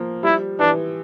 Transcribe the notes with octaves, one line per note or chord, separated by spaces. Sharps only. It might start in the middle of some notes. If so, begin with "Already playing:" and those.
Already playing: F3 A#3
G3 E4
E3 D4